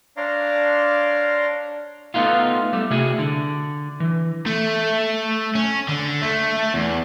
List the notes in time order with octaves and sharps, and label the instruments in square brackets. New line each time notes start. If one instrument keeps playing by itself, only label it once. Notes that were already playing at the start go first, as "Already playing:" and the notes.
[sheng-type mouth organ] D4 C#5 D5 F5 A#5 C6
[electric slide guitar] A3 B3 D#4 F4
G3 A3
C3 A3 E4 F#4 G#4
D3
E3
[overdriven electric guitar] A3
C#4
D3
A3
E2